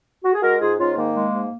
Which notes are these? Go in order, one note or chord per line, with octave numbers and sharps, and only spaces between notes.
F#4
G#4
G#3 F#4 A#4
G#2 F4 G#4
G#2 C#4 F4
D#3 A#3
G#3
G#2